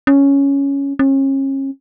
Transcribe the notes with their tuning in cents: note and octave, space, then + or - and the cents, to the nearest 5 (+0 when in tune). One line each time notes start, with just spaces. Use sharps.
C#4 +5
C#4 -35